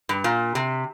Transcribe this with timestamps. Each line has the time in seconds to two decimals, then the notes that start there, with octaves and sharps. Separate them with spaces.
0.09 G2
0.24 A#2
0.55 C3